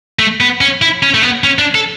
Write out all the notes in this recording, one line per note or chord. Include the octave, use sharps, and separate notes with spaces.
A3
B3
C#4
E4
C#4
A3
B3
C#4
D4
A4